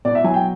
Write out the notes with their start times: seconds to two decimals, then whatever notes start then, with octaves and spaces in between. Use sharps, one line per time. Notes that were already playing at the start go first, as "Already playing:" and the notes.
0.05 B2 D5
0.15 E5
0.24 F#3 G#5
0.34 G5